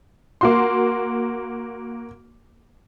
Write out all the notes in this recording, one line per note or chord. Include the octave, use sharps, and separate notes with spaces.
A#3 F#4 C6